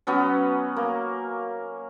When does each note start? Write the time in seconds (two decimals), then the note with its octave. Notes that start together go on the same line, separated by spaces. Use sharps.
0.07 F#3 B3 C#4
0.76 A#3